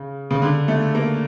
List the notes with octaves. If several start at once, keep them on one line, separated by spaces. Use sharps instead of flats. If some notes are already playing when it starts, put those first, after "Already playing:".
Already playing: C#3
C#3
D3
A3
A#3